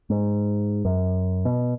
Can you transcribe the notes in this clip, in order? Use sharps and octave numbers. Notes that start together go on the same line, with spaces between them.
G#2
F#2
B2